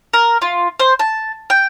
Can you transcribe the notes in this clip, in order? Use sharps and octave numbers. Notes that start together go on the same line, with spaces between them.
A#4
F4
C5
A5
G5